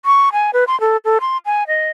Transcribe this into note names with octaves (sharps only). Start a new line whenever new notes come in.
C#6
G#5
B4
C6
A4
A4
C6
G#5
D#5